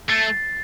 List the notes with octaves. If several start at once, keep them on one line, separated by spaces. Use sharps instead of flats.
A3 A6 C7